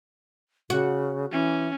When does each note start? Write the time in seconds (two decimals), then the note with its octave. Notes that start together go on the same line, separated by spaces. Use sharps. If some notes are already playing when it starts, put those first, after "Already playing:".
0.70 C#3 F#4
1.32 E3 C#4